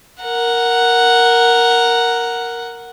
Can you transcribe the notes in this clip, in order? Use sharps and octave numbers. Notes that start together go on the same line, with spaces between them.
A#4 F#5